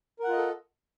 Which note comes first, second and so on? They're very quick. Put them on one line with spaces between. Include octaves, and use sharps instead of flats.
A#4 F#5 F4 D#5 A4